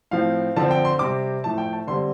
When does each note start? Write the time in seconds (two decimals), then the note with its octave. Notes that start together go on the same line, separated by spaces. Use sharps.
0.11 A2 F3 C4 F5
0.56 D3 F3 C4 A5
0.71 G5
0.85 C6
0.99 C3 G3 C4 D6
1.44 A2 F3 A3 A5
1.58 G5
1.73 A5
1.87 D3 G3 C4 C6